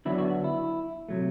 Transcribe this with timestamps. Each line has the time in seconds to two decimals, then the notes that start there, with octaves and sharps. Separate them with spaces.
0.05 D3 F#3 B3 D4 E4
0.18 F#4
0.44 E4
1.09 C3 F#3 A3